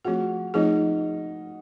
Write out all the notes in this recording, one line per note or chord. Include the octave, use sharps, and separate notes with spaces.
F3 A3 C4 F4 F#4 G#4
F3 A3 C4 D#4 F4 G#4